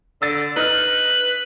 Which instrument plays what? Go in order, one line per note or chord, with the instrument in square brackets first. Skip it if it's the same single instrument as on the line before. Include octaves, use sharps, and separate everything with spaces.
[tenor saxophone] D3 [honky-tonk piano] E6 A6
[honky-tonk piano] D#4 D#5 F6 [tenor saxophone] B4